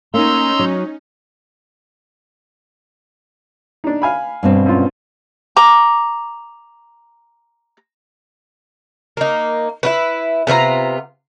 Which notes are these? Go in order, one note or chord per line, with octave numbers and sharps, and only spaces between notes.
A#3 C#4 D#4 A#5 C6 E6
F#3
D4 D#4
F5 G#5 B5
G2 B2 C4
F#2 F4
A#5 D6
A#3 D#4
E4 F4 B4
C3 B3 F4 A#5